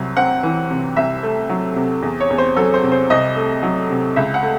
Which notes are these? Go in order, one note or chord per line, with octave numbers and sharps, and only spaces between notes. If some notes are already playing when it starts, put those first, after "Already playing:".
Already playing: C2 F#3
C4 F#5
E3
C3
C2 E5
A3
F#3
C3
E2
C#5
E2
C5
F#3 A4
C5
C3
C5
C2 D#5
A3
F#3
C3
C#2 E5
F#5
A3